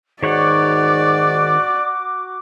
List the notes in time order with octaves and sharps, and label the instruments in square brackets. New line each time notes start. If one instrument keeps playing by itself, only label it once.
[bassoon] G#2 [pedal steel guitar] D#3 C#5 F#5 [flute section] F#4 D6 [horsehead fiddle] D5